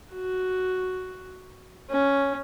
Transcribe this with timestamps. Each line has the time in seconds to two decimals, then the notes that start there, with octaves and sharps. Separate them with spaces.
0.12 F#4
1.90 C#4